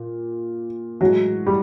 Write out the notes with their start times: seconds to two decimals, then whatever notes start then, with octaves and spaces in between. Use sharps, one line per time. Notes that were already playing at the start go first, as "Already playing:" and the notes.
Already playing: A#2
1.01 A2 E3 F#3 G#3 F#4
1.46 G3 G4